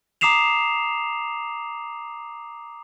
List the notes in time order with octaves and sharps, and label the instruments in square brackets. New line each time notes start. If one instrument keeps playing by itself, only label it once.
[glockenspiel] A#5 D6 D#6 C7 E7 F7